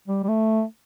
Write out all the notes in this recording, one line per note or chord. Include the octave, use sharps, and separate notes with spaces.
G3
G3
A3